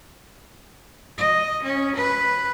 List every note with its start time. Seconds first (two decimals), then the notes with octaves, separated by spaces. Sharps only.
1.18 D#5
1.62 C#4
1.95 B4